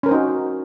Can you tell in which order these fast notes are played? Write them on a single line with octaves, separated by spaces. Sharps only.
C#4 A#4 C5 D#4 F#4